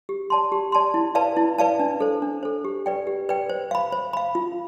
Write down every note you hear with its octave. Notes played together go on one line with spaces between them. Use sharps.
G4
D5 A5 C6
G4
D5 A5 C6
E4
B4 D5 F5 A5
E4
B4 D5 F5 A5
D4
A4 C5
D4
A4 C5
G4
B4 D5 G5
G4
B4 D5 G5
C5
F5 B5
C5
F5 B5
F4